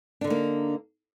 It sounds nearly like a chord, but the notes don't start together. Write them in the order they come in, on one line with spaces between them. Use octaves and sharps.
D4 D3 D#4 A#3